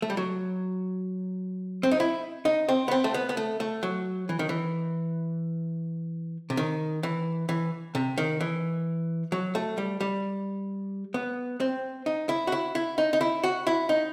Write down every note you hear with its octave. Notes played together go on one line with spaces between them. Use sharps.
A3
G3
F#3
C4
D#4
E4
D#4
C4
B3
C4
A3
B3
B3
A3
A3
F#3
E3
D#3
E3
C3
D#3
E3
E3
C3
D#3
E3
F#3
A3
G3
G3
B3
C4
D#4
E4
F#4
E4
E4
D#4
D#4
E4
F#4
E4
D#4